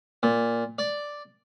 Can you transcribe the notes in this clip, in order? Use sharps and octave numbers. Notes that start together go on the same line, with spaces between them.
A#2
D5